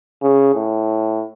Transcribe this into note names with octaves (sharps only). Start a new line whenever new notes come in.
C#3
A2